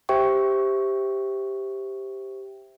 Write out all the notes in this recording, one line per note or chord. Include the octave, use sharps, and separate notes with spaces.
G4 C5 E5 G5 C#6